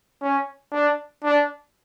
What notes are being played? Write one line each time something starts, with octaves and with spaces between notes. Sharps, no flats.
C#4
D4
D4